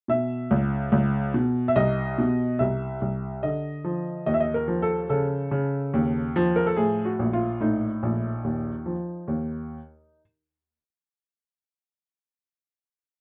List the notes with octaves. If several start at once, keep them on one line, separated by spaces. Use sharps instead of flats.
B2 E5
C#2
C#2
B2
E5
C2 D#5
B2
C2 E5
C2
D3 D#5
F3
D#2 D#5
E5
D#5
A#4
F3
A4
C#3 A4
C#3
D#2
F3
A#4
A4
A2 G#4
F#4
A#1
F4
A2 D#4
A#1
D#2
F3
D#2